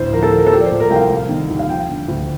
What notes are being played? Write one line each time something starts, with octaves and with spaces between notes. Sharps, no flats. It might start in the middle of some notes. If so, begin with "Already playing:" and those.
Already playing: D2 A2 C5
F3 A#4
A4
F3
A#4
A4
F3 G4
D5
C5
A#2
A#4
C2 G5
F5
G3
D#3
D#2
F5
F3 G5
D3
D2